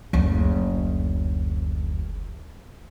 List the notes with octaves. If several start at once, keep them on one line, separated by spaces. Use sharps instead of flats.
F#1 D2